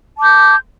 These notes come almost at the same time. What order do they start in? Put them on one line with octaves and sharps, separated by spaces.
A5 D6 G6